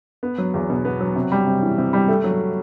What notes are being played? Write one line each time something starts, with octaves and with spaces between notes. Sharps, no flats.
B3
F#3
E2
B2
B3
F#3
C3
G3
C3
E3
C3
G3
A3
F#3